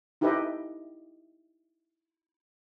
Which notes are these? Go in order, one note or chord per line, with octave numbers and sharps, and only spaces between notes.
D#4 E4 G4 A4 B4 D#5